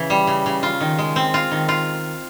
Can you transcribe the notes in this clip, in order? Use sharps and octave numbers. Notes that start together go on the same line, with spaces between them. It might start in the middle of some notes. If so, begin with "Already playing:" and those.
Already playing: C#3 E3
G3
C#3
C#3
F4
D#3
G#3
C4
F4
D#3
F4